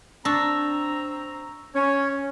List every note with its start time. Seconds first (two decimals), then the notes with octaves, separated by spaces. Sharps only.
0.25 C4 D4 A#5 C#6 E6 A#6
1.75 C#4 C#5